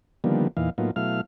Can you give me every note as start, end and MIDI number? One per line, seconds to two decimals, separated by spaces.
0.24 0.48 50
0.24 0.48 51
0.24 0.48 53
0.24 0.48 55
0.24 0.48 58
0.24 0.48 59
0.57 0.70 40
0.57 0.70 46
0.57 0.70 52
0.57 0.70 63
0.57 0.70 77
0.78 0.91 45
0.78 0.91 54
0.78 0.91 58
0.78 0.91 59
0.78 0.91 63
0.78 0.91 65
0.96 1.21 47
0.96 1.21 54
0.96 1.21 57
0.96 1.21 64
0.96 1.21 77
0.96 1.21 89